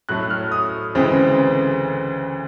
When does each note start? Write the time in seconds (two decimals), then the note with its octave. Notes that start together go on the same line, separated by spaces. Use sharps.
0.09 A2 F#3 A3 F#6
0.30 F6
0.52 D#6
0.95 D2 C#3 E3 G#3 C4